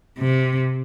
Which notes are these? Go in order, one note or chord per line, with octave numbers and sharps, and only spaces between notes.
C3